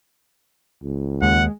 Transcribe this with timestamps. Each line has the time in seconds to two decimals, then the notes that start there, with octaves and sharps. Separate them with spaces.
0.82 C#2
1.22 D#2 G#3 F#5